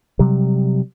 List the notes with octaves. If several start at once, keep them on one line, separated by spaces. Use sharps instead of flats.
C3 F#3 G3